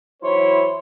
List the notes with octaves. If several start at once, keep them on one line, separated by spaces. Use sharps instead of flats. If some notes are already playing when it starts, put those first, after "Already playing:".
E3 F#3 E4 C5 C#5 C6